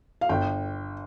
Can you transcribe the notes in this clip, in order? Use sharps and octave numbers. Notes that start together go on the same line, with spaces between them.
F5
G1 G5